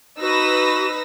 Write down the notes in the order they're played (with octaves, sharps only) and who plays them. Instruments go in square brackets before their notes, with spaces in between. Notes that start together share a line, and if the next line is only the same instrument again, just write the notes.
[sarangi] D#4 [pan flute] F#4 [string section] B4 [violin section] E6 A#6